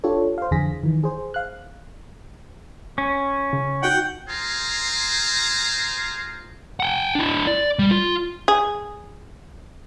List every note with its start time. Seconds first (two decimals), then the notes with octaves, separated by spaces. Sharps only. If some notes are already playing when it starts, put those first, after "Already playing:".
0.04 D4 F4 G4 A4 C#5
0.38 C5 F5
0.51 F2 D3 E3 G#4 A#6 B6
0.83 D#3 E3
1.04 G#4 C5
1.34 F5 F#6
2.98 C#4
3.53 C#3
3.83 D#4 F#4 F#5 G5
4.29 F4 G#4 C5 A#5
6.80 F#5 G5
7.15 D4 E4
7.47 D5
7.79 G3
7.91 F4
8.48 G#4